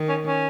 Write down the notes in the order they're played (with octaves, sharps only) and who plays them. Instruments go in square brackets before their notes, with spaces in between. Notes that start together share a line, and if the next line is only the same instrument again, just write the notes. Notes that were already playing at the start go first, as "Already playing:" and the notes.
Already playing: [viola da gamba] D#3
[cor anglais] C#4
C#4